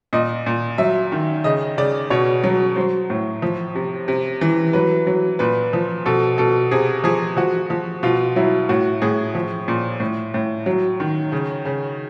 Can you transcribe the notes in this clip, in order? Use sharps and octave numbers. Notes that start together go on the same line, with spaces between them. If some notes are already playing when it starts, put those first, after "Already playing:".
A#2 D#5
A#2
F#3 E5
D#3
C#3 D#5
C#3 D5
B2 C#5
F#3
F#3 C5
A2
F3
C3
C3
E3
F#3 B4
F#3
A#2 B4
F3
B2 A4
B2 A4
C3 G#4
F3 G#4
F3 F#4
F3
B2 F4
F#3 E4
A2 F#4
A2 G#4
F3
A#2
A2
A2
F#3
D#3
C#3
C#3